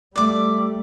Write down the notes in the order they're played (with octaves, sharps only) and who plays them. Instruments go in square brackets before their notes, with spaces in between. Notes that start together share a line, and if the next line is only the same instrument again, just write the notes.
[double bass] G3 A3 [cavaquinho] D5 D6